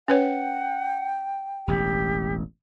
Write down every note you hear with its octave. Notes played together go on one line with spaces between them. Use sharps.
C#4 B4 C#5 F#5 G5
E1 A1 G4